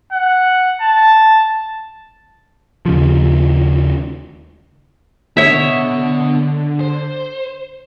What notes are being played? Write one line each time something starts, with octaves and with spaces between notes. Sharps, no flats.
F#5
A5
D#2 C#3 F3
D3 B3 C#5 D#5 E5
C5